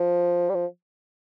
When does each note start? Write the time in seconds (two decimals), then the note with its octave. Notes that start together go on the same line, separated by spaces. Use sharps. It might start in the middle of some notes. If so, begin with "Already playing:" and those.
Already playing: F3
0.50 G3
0.55 F3